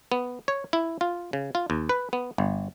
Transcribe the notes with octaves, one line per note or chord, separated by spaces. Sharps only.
B3
C#5
E4
F4
C#3
F4
D#2
B4
B3
G1